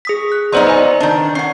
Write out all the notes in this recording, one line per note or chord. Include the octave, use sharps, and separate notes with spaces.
G#4 D#6 B6
F#6
F#3 B3 D#4 C5 D5 C6
B4 G#5
D#3 D4
C#4 F#5 C7